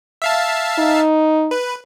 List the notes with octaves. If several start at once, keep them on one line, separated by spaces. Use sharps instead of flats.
E5 F5 A5
D#4
B4